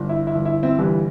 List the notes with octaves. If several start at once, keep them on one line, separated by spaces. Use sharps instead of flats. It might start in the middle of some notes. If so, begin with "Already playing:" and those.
Already playing: G1
E4
E4
G1
E4
C4 E4
G1 E3 G3